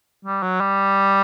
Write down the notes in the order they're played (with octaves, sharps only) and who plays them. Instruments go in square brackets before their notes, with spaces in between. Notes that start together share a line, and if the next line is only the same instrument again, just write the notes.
[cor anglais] G3
F#3
G3